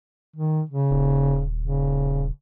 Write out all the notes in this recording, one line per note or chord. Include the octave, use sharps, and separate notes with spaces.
D#3
C#3
D#1
C#3